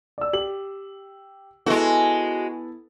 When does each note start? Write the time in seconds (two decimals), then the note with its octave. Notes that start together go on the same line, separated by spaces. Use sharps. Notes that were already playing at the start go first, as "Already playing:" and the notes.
0.18 D5 E6
0.33 G4 F#7
1.66 G#3 B3 E4 F#4 A4